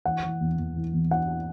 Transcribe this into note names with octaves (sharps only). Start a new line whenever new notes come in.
E3 F#5
E3
E2
E2
E3
E2
E3 F#5